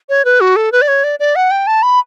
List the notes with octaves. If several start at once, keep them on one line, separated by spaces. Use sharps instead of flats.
C#5
B4
F#4
A4
B4
D5
C#5
D5
D5
F#5
G5
A5
B5